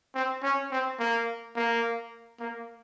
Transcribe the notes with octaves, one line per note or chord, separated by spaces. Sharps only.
C4
C#4
C4
A#3
A#3
A#3